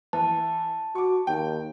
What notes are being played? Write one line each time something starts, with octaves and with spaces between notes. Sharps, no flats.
E3 A5
F#4 C#6 D6
D#2 G5